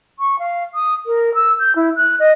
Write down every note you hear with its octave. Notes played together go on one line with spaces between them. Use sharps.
C#6
F5
D#6
A#4
E6
G6
E4
F#6
D#5